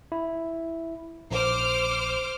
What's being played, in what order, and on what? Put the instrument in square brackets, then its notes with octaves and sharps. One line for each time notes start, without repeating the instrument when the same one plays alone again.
[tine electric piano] E4
[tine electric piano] A#1 [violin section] C5 D6 F6